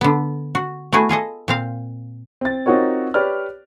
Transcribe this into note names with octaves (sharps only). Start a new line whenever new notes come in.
D3 B3
F#4
A3 B3 E4 F#4 G#4
F4 G#4 A4 D#5
A#2 C4 F5
C4 A6
C4 D#4 F4 F#4 A#4 C#5
G4 B4 C#5 D5 F6